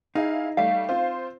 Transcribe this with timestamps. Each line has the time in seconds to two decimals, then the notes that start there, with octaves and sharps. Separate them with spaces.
0.15 D#4 E4 G#4 F5
0.57 G3 A3 F5
0.89 C4 F4 C5